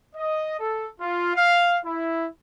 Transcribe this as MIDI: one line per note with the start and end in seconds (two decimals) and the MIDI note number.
0.16 0.58 75
0.60 0.87 69
1.00 1.32 65
1.35 1.78 77
1.85 2.26 64